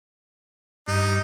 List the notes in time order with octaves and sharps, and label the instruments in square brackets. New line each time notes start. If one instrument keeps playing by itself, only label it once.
[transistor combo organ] G2 [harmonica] D#4